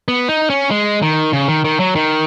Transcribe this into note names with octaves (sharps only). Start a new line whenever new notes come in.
B3
D#4
C#4
G#3
D#3
C#3
D#3
D#3
F#3
D#3